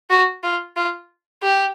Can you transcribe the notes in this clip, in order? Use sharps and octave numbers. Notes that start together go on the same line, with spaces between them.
F#4
F4
F4
G4